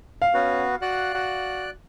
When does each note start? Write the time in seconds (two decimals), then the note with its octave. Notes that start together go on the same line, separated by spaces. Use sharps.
0.22 F5
0.34 B3 C#4 F#4 B4
0.82 F#4 D5 F#6
1.14 F#4